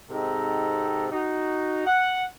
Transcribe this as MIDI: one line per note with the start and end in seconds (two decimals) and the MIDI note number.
0.10 1.06 44
0.10 1.06 48
0.10 1.06 60
0.10 1.06 63
0.10 1.06 69
0.10 1.06 82
1.11 1.83 63
1.11 1.83 66
1.86 2.24 78